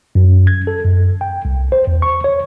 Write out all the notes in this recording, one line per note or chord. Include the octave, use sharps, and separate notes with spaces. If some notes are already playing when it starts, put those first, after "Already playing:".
F#2
G#6
A4
F#2
G5
C2
C5
E2
C#6
C#5